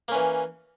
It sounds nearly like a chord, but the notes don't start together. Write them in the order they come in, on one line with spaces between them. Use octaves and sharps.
A#3 C#4 E3